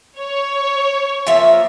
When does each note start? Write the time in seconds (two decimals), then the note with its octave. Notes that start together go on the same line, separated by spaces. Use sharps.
0.18 C#5
1.27 F3 A#3 E5